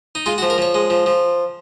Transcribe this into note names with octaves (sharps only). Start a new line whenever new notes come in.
D#4
G#3 F4
F#4
F3
A#4
F3 C#5
G#3
F3
F3